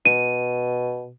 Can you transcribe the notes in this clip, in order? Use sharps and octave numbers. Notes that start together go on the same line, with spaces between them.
B2 D#7